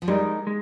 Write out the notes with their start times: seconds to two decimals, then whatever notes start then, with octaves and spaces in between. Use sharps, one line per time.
0.02 F3
0.08 G3 G#3 D#4 A#4 D#5
0.47 G#3